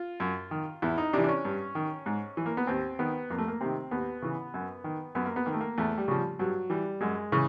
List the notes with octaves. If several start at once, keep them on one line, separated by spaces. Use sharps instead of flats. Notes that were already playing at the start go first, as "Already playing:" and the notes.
Already playing: F4
F#2
D#3
E2 E4
D#4
C3 E3 D4
D4
C#4
G2
D#3
G#2
E3
A#3
B3
D#2 C4
D#3 B3
F2 A#3
A3
A#3
C3 D#3 C4
D#2 B3
C#3 E3
F#2
D#3
F#2 B3
A#3
B3
D#3 A#3
A3
A#3
E2 A3
G3
C#3 F3
G2 F#3
E3 G3
F#2 G#3
C#3 E3